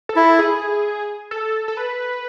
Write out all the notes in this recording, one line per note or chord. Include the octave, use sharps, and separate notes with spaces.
A4
E4
G#4
A4
A4
B4